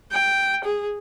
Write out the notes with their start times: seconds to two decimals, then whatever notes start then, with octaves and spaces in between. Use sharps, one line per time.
0.11 G5
0.64 G#4